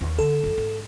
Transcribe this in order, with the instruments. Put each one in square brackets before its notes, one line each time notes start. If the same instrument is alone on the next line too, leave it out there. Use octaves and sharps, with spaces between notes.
[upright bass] D#2
[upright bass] D3 [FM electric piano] A4
[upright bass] F2 F#3
G#2